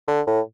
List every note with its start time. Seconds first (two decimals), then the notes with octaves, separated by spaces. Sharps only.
0.08 D3
0.27 A2